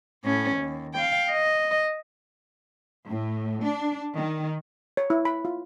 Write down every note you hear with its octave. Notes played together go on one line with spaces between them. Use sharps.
A2 C#4
D#2
F5 G5
D#5
A2
D4
D#3
C#5
E4
B5
F4